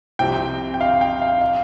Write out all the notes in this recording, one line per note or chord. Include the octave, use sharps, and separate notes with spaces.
C2 C3 F3 C4 G4 G5
G5
F5
G5
F5
F5